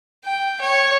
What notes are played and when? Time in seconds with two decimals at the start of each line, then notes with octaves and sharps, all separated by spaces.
0.24 G5
0.61 C#5